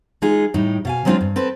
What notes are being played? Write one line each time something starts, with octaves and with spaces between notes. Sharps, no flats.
G#3 D#4 F4 G#4
A2 G3 D#4
B2 F5 G#5
F#3 G#3 B3 C4 D4 F4
G2
C4 A4 B4